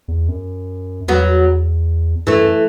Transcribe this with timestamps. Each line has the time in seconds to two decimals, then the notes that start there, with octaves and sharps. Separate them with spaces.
0.08 E2
0.29 F#2
1.08 E2 F#3 B3
2.27 F#2 E3 A3